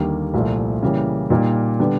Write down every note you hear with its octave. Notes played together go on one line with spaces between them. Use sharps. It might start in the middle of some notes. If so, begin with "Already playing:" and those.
Already playing: D#2 D3 G3 A#3
C2 A#2 F3 A3
C#3 E3 G3 A#3
A#2 G3 A#3 D#4
D3 G3 B3